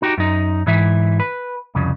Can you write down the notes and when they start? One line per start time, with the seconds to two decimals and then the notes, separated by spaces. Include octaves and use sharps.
0.02 D#4 F#4 G4
0.18 F#2 D#4
0.67 G#2 E3 E5
1.20 B4
1.75 C2 F2 C#3